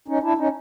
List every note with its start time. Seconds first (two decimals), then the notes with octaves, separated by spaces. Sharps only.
0.08 C#4 D#4
0.23 D4 E4
0.37 C#4 D#4